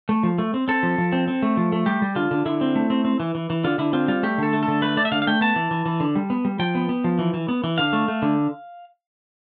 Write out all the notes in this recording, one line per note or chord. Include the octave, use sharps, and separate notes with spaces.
A3
F3
A3
C4
C4 A4
F3
F3
C4
C4
A3
F3
A3
G3 G4
G3
D3 F4
D3
D3 E4
C4
A3
C4
C4
E3
E3
E3
D3 F4
D3 E4
C4 F4
G3 F4
A3 G4
D3 A4
A3
A4
D3
A3 B4
A3 D5
E5
D3 F5
F5
A3 G5
B3 A5
E3
E3
E3
D3
G3
B3
G3
F3 G5
B3
B3
F3
E3
E3
B3
E3
D3 F5
A3
A3
D3